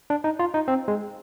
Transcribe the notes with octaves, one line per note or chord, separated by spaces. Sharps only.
D4
D#4
F4
D#4
C4
G#3